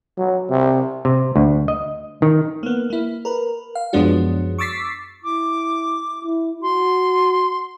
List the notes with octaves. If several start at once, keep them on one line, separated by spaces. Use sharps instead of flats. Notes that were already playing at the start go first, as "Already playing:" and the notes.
F#3
C3
C3
D2
D#5
D#3
A#3 B3
A#3 E4
A#4 B4
F5
F#2 F3 G#3 B3 D4 F#4
C#6 D6 E6 A6 B6 C7
E4 D6
E4
F#4 C6